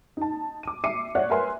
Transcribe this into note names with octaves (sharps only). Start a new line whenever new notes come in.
D#4 A5
D6 D#7
E5 D6 C7 C#7 D#7
C#5 D5 E5 F#5 F#6
A#4 B4 E5 G#5 C6